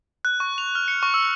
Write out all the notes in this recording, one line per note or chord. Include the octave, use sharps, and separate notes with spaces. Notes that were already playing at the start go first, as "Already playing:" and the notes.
F#6
C#6
F7
F6
C#7
C#6
E6